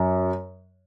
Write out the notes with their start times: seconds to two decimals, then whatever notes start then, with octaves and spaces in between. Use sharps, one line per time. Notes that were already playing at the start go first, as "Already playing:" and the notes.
Already playing: F#2